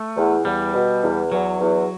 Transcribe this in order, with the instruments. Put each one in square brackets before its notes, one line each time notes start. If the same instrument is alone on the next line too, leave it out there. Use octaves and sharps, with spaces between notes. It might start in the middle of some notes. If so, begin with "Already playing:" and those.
Already playing: [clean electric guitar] A3
[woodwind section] E2
[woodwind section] E2 [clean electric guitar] G3
[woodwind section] B2
E2
[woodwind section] E2 [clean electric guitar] F#3
[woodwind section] E2